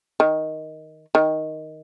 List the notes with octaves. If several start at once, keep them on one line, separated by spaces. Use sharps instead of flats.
D#3
D#3